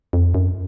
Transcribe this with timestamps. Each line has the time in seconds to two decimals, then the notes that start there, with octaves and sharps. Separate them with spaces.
0.13 F2
0.34 F#2